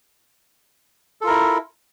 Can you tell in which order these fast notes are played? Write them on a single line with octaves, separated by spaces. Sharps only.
A4 F4 A#4 E4